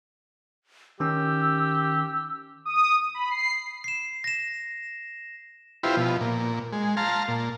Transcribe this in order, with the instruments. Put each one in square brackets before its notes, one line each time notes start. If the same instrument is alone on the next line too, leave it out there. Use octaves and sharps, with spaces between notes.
[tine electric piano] D#3 C#4 [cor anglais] G4 [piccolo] E6
[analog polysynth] D#6
B5
C7
[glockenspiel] C7 E7
A#6 E7
[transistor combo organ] E4 F4 G4 B4 C5
B2 F3
A#2
G#3
F5 A5 A#5 C6
A#2